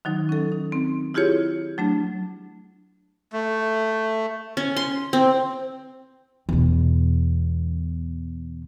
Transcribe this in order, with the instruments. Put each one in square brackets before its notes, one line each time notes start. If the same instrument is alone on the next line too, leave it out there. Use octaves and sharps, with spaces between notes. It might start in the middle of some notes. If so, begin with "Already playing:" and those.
[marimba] D#3 F#3 D#4
C#4 A4
D#4
C4
E4 F4 G4 G#4 C#5
F#3 A3 D4
[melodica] A3
[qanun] C#4
C6
C4
[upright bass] E2 B2